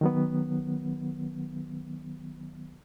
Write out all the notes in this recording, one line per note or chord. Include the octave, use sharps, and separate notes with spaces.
D#3 F#3 B3